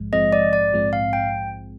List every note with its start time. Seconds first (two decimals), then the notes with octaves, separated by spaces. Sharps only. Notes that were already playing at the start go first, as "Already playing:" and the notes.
Already playing: A#1 G#2 F3 G#3
0.13 A#1 G#2 F3 G#3 C4 D#5
0.33 D5
0.53 D5
0.73 A#1 G#2 F3 G#3 C4
0.93 F5
1.13 G5